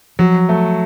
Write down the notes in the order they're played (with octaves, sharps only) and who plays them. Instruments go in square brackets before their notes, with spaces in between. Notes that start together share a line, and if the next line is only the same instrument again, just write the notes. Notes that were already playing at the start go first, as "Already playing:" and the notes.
[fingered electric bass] F3 [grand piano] F#3
[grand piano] A3